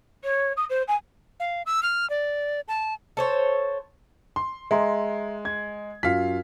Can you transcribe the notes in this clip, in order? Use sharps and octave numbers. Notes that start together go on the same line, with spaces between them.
C#5
D#6
C5
G#5
F5
E6
F6
D5
A5
A4 C5 C#5
C6
G#3 E5 A#5 C6
G#6
F#2 F4 F5 B6